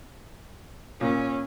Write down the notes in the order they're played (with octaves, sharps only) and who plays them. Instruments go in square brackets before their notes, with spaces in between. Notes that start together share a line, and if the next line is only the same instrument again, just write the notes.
[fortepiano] A#2 [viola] C#4